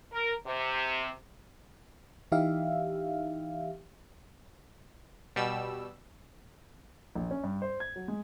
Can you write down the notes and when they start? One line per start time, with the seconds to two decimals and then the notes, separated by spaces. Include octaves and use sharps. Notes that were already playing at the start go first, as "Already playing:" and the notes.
0.12 A#4
0.47 C3
2.32 E3 D#4 G4 E5 F5
5.36 B2 G3 E6
7.16 A#1
7.31 C#4
7.44 G2
7.62 C5
7.80 G#6
7.96 F#3
8.08 G#3